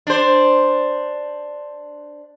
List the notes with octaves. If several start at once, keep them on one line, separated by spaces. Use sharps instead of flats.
D4 C5